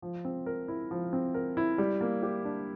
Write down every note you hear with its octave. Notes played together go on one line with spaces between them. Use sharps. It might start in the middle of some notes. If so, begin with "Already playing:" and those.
F3
C4
A#4
E4
F3
C4
A#4
E4
G3
A#3
G4
D4